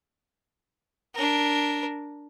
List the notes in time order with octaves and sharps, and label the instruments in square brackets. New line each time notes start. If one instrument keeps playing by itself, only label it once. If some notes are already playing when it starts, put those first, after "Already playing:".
[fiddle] D4 A#4